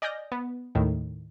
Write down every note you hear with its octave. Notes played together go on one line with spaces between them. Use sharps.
D5 D#5 G#5 F6 G6 A#6
B3
D#2 A2 D#3